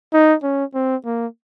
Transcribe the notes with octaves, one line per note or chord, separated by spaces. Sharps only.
D#4
C#4
C4
A#3